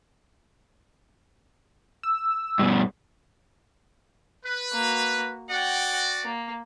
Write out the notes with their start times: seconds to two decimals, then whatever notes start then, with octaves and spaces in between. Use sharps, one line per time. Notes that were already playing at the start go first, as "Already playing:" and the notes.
2.03 E6
2.59 G2 B2
4.43 B4
4.72 A#3 F#4
5.49 F#4 D5 F#5 G5
6.24 A#3